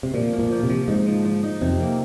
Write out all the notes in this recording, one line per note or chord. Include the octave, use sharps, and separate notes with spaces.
C3
A#2 F3
A#3
A#2
F3
C3
F3
G#2 D#4
F3
F3
D#4
F2 C3
A#3